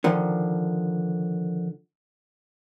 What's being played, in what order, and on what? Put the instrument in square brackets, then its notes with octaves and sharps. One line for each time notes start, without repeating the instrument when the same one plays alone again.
[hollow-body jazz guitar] D3 D#3 F3